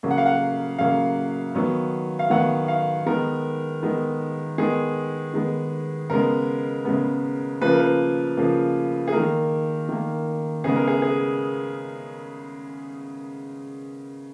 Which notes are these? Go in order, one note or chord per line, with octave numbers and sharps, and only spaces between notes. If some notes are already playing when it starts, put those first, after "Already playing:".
C#3 F#3 A#3
F#5
F5
F#5
C#3 F#3 A#3 F5
D#3 F#3 B3
F5
D#3 F#3 B3 F#5
F5
D#3 G#3 B3 A#4
D#3 G#3 B3
D#3 G#3 B3 G#4
D#3 G#3 B3
C#3 G#3 B3 A#4
C#3 G#3 B3
C#3 F3 A#3 B4
A#4
B4
C#3 F3 A#3
G#4
D#3 A#3 A#4
D#3 A#3
C#3 G#3 B3 G#4
A#4
G#4
G#4